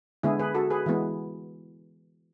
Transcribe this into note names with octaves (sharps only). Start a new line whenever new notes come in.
D3 G#3 B3 E4 G#4
G#4 B4
F#4 A4
G#4 B4
E3 G#3 B3